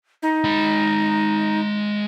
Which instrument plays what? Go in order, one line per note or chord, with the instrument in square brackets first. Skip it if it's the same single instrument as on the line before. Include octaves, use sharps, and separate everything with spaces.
[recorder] D#4
[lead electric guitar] G#3 B5